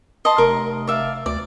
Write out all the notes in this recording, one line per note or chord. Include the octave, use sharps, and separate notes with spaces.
D#5 A5 C6
F1 A#4
D5 E5 F5
D2 D5